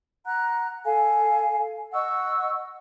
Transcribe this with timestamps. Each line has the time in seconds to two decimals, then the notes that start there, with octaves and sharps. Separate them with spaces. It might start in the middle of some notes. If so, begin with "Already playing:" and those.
0.25 F#5 A#5 F#6
0.85 A4 F5 G#5
1.93 D#5 F#5 C#6 E6